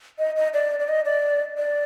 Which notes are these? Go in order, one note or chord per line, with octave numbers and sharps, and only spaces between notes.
D#5
D#5
D5
D5
D#5
D5
D5